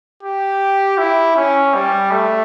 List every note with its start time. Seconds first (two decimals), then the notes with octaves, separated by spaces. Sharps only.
0.23 G4
0.98 E4
1.37 C#4
1.74 G3
2.11 A3